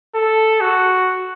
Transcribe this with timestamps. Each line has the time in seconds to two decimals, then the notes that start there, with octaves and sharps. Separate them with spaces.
0.15 A4
0.61 F#4